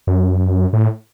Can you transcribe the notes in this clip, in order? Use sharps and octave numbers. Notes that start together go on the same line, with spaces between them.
F#2
A2